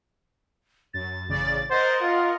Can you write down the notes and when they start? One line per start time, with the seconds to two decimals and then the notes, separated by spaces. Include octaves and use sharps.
0.94 F#2 A6
1.28 A1 C#3 D5
1.70 A#4 C5 D#5 F#5 A6
2.01 F4